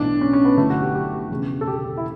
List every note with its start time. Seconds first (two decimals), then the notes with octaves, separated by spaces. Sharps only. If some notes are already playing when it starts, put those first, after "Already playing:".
Already playing: B1 A2 E3 D4
0.21 C#4
0.33 C#4
0.45 B3
0.57 G1 F#2 E3 A3
0.70 F#4
0.82 G4
0.95 G4
1.31 E1 E2 C#3
1.61 A4
1.67 G4
1.97 E4